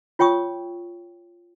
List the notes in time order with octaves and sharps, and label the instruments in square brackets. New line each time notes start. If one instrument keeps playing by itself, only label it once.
[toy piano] F4 C#5 G5 C#6 D#6